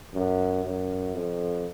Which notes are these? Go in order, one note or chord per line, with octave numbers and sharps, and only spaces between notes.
F#2
F#2
F2